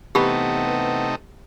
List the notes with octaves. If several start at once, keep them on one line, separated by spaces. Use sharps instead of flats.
C3 E3 A3 B3 D#4 G4 B5